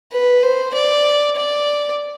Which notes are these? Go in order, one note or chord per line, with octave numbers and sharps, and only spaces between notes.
B4
C5
D5
D5